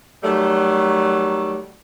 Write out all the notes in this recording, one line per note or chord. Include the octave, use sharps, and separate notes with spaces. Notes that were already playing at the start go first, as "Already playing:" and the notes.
D#3 F#3 G3 A3